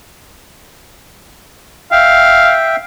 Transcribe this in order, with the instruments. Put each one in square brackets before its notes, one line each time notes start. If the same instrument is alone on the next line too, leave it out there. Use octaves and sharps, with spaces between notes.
[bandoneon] E5 G5 [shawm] F5